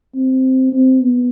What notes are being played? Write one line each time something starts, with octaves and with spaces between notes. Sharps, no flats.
C4
C4
B3